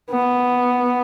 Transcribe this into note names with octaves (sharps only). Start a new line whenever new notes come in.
B3